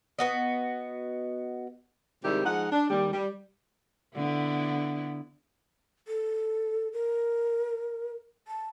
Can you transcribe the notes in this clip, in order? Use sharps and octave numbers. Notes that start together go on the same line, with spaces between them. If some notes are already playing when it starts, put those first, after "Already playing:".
B3 F#4 D#5
G#2 C3 D#3 G3 E4 G4
F3 G#3 D#4 F#5
D4
D#2 G3
G3
D3 B3 E4
A4
A#4
A5